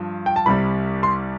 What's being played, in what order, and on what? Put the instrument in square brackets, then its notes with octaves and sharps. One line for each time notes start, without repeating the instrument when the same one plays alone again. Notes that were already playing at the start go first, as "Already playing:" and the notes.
Already playing: [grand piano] G2 F3
G5
A5
C2 C3 G3 B5
C6